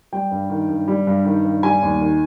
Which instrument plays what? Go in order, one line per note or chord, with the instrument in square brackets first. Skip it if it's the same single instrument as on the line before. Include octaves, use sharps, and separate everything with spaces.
[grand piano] G3 G5
G2
D#3
G2
G3
G2
D#3
G2
G3 G#5
D#2
D#3